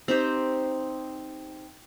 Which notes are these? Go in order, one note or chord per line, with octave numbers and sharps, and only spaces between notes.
C4 D#4 G4 C5